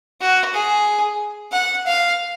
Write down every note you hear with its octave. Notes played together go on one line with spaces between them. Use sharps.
F#4
G#4
F#5
F5